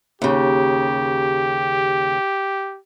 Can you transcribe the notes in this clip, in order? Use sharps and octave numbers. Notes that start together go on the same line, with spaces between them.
D#2 C#3 G4